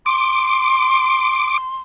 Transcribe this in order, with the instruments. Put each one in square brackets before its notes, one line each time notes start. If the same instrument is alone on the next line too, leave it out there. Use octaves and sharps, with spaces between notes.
[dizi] C6 [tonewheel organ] D6